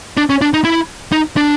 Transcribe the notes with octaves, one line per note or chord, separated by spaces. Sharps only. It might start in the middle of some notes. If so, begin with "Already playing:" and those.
D4
C#4
D4
D#4
E4
D#4
D4